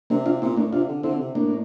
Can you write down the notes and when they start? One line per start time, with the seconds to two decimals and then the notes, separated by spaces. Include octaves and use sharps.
0.10 C3 A#3 D4
0.26 D4 F4
0.42 A#2 C4 E4
0.57 A2 A#3 D4
0.73 C3 D4 F4
0.88 D3
1.03 D3 C4 E4
1.20 C3
1.35 A2 A#3 D4